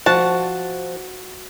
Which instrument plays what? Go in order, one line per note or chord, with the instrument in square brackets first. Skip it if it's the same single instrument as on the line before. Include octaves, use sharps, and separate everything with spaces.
[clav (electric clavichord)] F3 [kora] F#4 [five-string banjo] A5